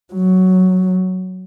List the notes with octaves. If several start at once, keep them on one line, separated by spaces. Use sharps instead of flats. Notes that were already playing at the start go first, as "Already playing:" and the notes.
F#3